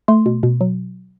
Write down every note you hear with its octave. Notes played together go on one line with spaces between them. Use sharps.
A3 C6
B2
B2
F#3